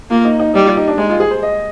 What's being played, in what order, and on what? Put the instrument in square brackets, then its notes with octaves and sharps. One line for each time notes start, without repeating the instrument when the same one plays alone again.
[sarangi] A#3 [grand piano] F4
[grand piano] D#4
D#4
[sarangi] G3 [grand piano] D#4
[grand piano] F4
D#4
D4
[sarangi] G#3 [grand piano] D#4
[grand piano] F4
G#4
C5
D#5